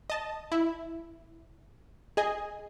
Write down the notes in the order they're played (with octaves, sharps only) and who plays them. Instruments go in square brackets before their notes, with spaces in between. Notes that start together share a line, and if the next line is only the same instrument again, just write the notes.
[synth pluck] D#5 A5
E4
G#4 D#5 G#5